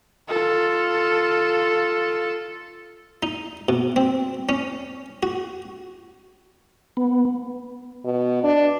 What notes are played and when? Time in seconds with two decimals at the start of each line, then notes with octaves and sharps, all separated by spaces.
0.29 F4 A4
3.23 D#4
3.69 B2
3.96 C4
4.49 C#4
5.23 F#4
6.97 B3
8.05 B2
8.43 D4